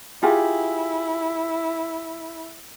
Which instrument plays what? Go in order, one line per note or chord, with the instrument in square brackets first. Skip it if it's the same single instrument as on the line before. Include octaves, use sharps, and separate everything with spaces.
[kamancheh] E4 [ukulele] F4 G4 G#4